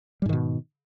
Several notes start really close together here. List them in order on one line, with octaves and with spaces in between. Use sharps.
G3 G#2 D#3 B2